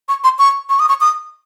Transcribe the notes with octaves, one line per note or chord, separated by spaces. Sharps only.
C#6
C6
C#6
C#6
D#6
C#6
D#6